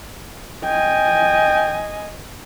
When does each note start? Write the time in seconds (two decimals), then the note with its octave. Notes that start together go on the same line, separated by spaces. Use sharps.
0.64 D#5 G5 G#5